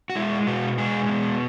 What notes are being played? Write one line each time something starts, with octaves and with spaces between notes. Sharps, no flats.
F#4
G#3 E4
B2 F#4
G#3 G#4
B2